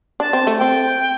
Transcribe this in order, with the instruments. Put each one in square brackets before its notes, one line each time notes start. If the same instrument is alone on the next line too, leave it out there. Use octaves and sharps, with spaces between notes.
[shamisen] D4 [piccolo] A5
[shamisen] C4
A3
[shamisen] C4 [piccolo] G5